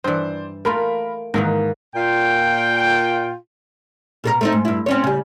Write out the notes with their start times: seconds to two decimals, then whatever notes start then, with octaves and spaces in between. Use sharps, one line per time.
0.04 G2 E3 C5 D5
0.65 A3 A#3 F4 A#4 B5
1.34 G#2 D#3 E3 A#3
1.96 A#2 F4 G5
4.24 B2 A4 A#4
4.41 A3 C4 D#4
4.52 G#2
4.65 G2 E4
4.86 C4 C#4 C#5
5.04 C#3 G3